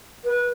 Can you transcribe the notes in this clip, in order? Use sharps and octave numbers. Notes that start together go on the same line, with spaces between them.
B4